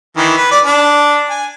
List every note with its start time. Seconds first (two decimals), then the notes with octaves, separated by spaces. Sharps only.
0.17 D#3 E3
0.37 B4
0.51 D5
0.65 D4
1.30 G#5